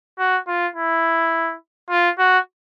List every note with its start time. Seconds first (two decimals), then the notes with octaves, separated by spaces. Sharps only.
0.19 F#4
0.47 F4
0.76 E4
1.90 F4
2.18 F#4